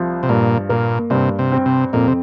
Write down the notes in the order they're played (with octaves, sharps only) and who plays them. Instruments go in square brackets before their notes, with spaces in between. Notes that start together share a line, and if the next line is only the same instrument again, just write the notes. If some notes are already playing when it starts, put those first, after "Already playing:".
Already playing: [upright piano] C2 F3
[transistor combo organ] C3
[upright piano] G2 [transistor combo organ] A#2
[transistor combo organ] A#2 [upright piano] A#3
[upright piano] G2 [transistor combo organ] C3
[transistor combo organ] C3
[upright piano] C4
[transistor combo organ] C3
[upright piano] F2 [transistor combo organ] A#2
[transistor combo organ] C3